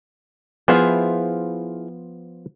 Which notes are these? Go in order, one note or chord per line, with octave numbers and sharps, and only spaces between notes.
F3 B3 E4 F4 G#4 C5